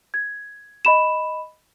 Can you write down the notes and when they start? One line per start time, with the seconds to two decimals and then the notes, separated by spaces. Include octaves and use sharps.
0.14 G#6
0.85 D#5 B5 E7